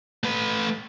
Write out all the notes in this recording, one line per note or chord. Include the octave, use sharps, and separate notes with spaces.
A3 B4